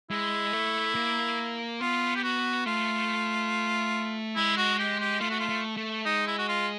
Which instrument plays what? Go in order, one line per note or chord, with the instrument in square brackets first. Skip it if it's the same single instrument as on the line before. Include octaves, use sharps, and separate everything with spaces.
[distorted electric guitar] G#3 [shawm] E4
[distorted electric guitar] A3
A#3
[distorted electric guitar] B3 [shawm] F4
[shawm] G4
F#4
[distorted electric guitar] A3 [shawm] F4
[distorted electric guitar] G#3 [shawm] E4
[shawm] F#4
G4
G4
[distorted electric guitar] A3 [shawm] F4
[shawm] F#4
F4
[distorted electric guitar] A3
A3
[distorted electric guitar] G#3 [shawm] D#4
[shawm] E4
F#4
F4